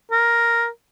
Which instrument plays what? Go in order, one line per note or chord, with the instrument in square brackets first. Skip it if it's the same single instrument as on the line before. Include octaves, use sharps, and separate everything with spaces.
[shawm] A#4